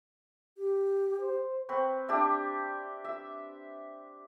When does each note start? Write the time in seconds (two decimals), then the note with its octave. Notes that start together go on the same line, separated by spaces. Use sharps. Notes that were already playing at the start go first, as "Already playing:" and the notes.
0.57 G4
1.20 C5
1.69 C4 B4 C#6
2.09 D4 G4 D5 E5
3.04 E5